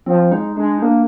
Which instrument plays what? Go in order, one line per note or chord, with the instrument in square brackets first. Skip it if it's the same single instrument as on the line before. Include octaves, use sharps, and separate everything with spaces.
[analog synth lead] F3 [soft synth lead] C4
[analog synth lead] G#3 [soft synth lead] D#4
[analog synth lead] G#3 [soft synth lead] D4
[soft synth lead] D#4
[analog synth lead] A#3 [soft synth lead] D4